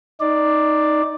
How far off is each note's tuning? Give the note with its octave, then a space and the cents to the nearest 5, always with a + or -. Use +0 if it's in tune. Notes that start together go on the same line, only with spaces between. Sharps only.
D#4 +0 D5 +5